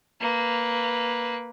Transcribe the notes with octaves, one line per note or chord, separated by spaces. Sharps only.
A#3 B4